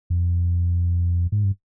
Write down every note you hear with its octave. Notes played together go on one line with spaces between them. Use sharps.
F2
G#2
G2